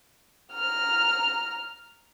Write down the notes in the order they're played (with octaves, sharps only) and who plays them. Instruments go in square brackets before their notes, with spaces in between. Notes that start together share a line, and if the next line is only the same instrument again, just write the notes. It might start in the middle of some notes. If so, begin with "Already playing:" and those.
[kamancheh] A#5 F6